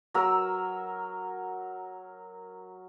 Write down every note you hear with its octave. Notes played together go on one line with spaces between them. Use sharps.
F#3 A#4 E6